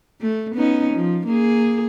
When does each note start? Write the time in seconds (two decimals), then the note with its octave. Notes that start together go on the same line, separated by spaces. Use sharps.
0.21 A3
0.56 B3 C#4 D#4
0.95 F3
1.27 A#3 G#4